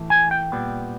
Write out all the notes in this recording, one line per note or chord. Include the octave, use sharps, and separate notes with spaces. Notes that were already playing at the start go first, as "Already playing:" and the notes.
Already playing: A2 E3 A3
G#5
G5
A#2 G3 B3